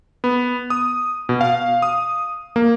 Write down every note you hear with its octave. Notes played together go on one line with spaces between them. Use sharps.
B3
D#6
B2
F5
D#6
A#3